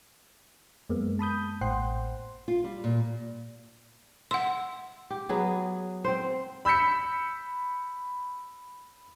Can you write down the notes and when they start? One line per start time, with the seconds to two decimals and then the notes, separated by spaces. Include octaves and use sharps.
0.90 F#2 G#3 A#3 B3
1.19 A5 B5 D#6 G6
1.61 A1 A2 C5 F#5 G5 C6
2.48 F4
2.64 G3
2.84 A#2
4.31 E5 F#5 C6
5.10 G4
5.29 F#3 B3 G#4
6.04 C4 C5
6.65 B5 E6 G6 B6 C#7